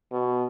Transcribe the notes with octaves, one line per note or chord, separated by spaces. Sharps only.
B2